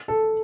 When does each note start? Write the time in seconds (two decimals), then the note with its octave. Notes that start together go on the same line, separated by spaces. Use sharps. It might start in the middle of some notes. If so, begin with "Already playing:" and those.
0.08 A4